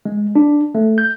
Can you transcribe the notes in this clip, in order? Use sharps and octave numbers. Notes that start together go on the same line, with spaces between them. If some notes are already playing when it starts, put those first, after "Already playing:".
G#3
D4
A3
G6